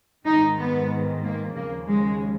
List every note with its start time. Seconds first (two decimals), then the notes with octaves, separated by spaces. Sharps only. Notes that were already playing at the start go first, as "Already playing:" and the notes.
0.25 G#2 D#3 D#4
0.58 B3
1.23 A#3
1.55 D#2 C#3 F3 A#3
1.87 G#3